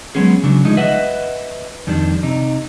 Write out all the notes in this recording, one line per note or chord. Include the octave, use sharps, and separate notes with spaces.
F#3 G#3 B3 C#4 G#4
C#3 F#3 D4
D2 F3 G#3 D#4
B4 D#5 E5 F#5
F2 D#3 G3 D4
C3 D#4